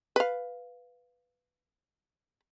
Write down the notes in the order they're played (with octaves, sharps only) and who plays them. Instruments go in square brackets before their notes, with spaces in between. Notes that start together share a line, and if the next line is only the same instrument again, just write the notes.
[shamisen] B4 F5